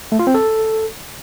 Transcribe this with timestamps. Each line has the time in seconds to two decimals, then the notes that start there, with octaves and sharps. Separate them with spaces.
0.12 A3
0.19 F4
0.27 C4
0.34 A4